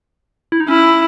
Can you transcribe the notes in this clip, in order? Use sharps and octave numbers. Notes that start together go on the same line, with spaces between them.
E4
D#4
C#4 E4